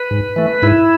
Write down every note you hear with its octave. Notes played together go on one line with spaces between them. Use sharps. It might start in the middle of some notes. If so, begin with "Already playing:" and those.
Already playing: B4
G#2
E3 A3
G#2 E4